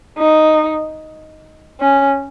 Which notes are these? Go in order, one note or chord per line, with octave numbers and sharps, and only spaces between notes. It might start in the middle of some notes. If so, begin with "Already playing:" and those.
D#4
C#4